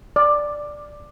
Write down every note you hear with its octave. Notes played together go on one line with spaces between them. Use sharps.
D5